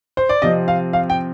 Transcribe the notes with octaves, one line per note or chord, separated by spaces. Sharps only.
C5
D5
C3 F3 C4 D#5
F5
F5
G5